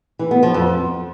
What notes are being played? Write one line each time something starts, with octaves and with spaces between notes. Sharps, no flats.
E3
B3
F3
F2